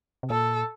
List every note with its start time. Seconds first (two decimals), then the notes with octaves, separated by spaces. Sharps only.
0.23 C3
0.30 A#2 A4